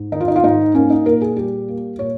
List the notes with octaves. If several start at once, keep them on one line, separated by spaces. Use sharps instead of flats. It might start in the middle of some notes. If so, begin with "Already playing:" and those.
Already playing: G#2
D#3 D#4
F4
D#4
F4
G#2 D#4
A#3 C#4
D#4
A#2 A#4
G#4
G3 G4
A#3
A#2 C#5